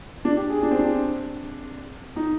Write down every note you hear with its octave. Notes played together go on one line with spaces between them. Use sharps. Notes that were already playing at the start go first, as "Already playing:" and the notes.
D4
G4
G#4
D4
C4
D4
D#4